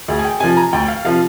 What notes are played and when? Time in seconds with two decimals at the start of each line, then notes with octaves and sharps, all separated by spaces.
0.08 D2 G#4
0.19 G#5
0.25 G5
0.40 C3 F3 G#5
0.57 A#5
0.73 D2 G5
0.88 F5
1.05 C3 F3 F5